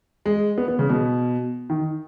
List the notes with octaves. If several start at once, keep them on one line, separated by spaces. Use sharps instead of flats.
G#3
B3
B3
C#3
B2
D#3